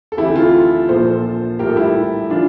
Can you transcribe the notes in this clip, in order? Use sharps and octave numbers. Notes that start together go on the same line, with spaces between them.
A4
D2 C3 E3 A3 E4 G4
F4 A4
A#1 A#2 F3 A4 C5
A#1 A2 G3 G4 A#4
A4
E4 G4
E3 A3 D4 F4